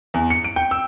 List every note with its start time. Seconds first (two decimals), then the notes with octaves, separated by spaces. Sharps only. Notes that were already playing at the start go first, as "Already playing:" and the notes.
0.14 E2
0.30 C#7
0.45 D7
0.56 G5
0.71 E6